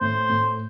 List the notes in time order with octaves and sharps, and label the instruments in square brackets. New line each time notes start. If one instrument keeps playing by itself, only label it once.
[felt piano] A2 [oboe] C5
[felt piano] A2